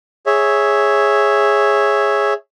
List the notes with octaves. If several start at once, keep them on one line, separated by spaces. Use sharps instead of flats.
G#4 C#5 E5